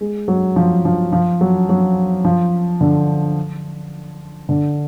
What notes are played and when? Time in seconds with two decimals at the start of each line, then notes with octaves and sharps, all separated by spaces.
0.01 G#3
0.28 F#3
0.56 F3
0.85 F3
1.12 F3
1.41 F#3
1.69 F#3
2.25 F3
2.81 D3
4.49 D3